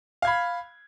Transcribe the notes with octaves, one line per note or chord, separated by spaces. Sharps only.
F5 B5 G#6